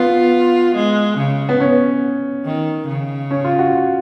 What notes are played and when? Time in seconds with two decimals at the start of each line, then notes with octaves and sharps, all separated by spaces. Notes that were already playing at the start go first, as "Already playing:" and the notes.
Already playing: B3 F4
0.76 G#3
1.18 C#3
1.49 B3
1.60 C#4
2.46 D#3
2.88 C#3
3.31 C#4
3.45 F4
3.59 F#4